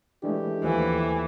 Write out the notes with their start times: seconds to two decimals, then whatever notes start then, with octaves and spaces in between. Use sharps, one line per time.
0.24 E3 G#3 A3 D4 G4
0.64 D#2 E3 F3 A3